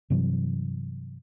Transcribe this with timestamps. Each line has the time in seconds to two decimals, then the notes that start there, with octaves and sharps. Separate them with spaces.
0.10 G2 C3 E3 F#3